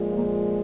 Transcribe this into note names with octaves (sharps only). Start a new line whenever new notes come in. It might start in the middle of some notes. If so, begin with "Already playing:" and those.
Already playing: A#2 F3 G#3
A#3